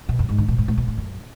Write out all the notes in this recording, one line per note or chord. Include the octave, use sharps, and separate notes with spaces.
B2
F#2
G#2
D3
B2
G#2
A2
B2
A2
F#2